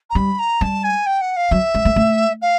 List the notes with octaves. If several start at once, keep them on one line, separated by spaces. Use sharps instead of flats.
A#5
G3 B5
A#5
G3 A5
G#5
G5
F#5
F5
F#3 E5
G#3
A3
A3
F5